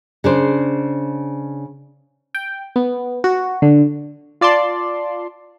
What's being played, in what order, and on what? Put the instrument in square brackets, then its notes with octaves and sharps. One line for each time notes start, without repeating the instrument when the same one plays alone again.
[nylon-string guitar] C#3 D4 C5
[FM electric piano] G5
B3
F#4
D3
[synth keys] F4 D5 A5 C6